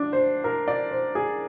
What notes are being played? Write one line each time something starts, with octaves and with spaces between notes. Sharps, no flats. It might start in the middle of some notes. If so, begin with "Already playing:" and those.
Already playing: D4
C5
A#4
D5
C5
G#4